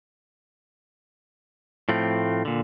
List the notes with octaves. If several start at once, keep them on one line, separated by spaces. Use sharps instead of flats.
A2 F3 A3 C4
A#2 D3